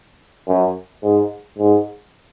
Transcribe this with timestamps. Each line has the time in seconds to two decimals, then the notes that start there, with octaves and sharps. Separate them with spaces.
0.48 F#2
1.03 G#2
1.58 G#2